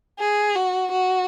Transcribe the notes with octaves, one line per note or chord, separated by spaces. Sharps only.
G#4
F#4
F#4